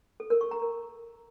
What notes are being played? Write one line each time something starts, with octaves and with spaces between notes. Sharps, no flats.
A4
A#4
C#6
A#5
A#4